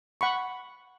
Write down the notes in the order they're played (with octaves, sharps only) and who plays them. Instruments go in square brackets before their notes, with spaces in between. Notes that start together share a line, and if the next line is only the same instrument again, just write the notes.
[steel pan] F#5 B5 C#6